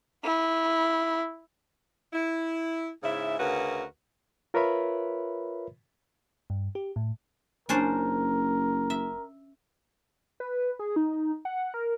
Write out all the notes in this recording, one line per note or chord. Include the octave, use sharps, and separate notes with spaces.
E4
E4
G#2 C#3 E4 G#4 E5
D2 C#3 F#4 A#4 B4
F4 A#4 B4 C#5 E5 B5
G2
G4
A2
F#1 C#4 D4 A#4 C5
E5
B4
G#4
D#4
F#5
A#4